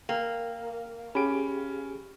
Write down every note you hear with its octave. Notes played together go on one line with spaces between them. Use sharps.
A#3 A#4 G5
C#4 G4 G#4 B5 D7